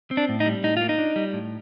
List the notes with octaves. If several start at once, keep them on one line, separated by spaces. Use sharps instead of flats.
C4
D4
A2
D#4
G3
A2 D#4
A#3 F4
D#4
D4
G3
A2